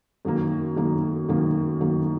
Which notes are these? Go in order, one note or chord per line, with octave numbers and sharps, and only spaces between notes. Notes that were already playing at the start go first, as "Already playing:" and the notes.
F#2 D#3 A#3
F#2 D#3 A#3
F#2 D#3 A#3
F#2 D#3 A#3